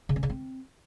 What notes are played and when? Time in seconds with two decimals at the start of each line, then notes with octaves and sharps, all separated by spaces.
0.09 C#3
0.16 C#4
0.23 C#3
0.30 C4